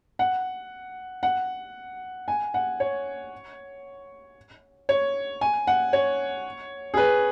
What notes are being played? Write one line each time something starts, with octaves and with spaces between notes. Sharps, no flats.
F#5
F#5
G#5
F#5
C#5
C#5
G#5
F#5
C#5
G#4
B4